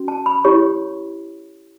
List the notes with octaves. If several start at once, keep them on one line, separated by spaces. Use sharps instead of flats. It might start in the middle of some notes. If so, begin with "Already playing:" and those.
Already playing: C#4 F#4
A5
B5
E4 G4 C#5 C#6